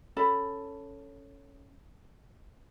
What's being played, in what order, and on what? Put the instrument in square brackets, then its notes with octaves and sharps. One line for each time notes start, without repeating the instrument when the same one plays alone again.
[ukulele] C#4 A4 B5